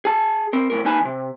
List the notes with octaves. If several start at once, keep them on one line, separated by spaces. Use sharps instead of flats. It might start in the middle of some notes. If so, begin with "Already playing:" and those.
G#4 A5
C4 A#4
F2 A2 A#4
A#3 D#4 B4 G#5 A5 B5
D#2 C3